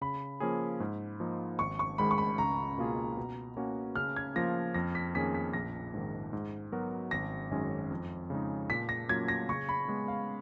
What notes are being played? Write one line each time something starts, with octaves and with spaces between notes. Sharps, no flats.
C#3 B5
F3 A#3 C#4 G#4
G#2
F3 A#3 D#4
G#1 C#6
C#6
G#2 D#3 G#3 B5
C#6
B5
C#2 A#5
B2 A#3 F4 G#4
B2
A#3 C#4 F#4
C#3 F6
G#6
F3 A#3 F4 A#6
F2 A#6
B6
D#3 A#3 C#4 G#4 B6
B6
A#1 A#6
G#2 D#3
G#2
F#3 B3 F#4 A#4
G#1 A#6
F#2 D#3 G#3 C#4
F2
C#3 G#3 D#4
A#2 B6
A#6
F#3 A#3 F4 G#6
A#6
C#3 C#6
B5
G#3 B3
F5